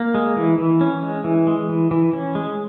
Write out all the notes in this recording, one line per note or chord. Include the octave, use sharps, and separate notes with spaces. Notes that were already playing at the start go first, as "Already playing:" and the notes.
Already playing: A#3
G#3
E3
E3
C#4
G#3
E3
G#3
E3
E3
C#4
G#3